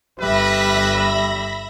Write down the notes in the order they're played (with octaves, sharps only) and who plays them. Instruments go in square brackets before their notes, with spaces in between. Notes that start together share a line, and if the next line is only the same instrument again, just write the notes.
[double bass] G1 G3 [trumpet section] B4 [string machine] E5 B5 A#6